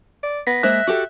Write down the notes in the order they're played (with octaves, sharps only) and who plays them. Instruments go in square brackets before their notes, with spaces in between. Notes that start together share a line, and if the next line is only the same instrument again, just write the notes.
[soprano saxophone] D5
[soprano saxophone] B3 [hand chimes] A#6 B6
[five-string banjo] G#3 A#3 C5 [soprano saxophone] E5 [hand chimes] F#6
[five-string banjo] F#4 G4 A4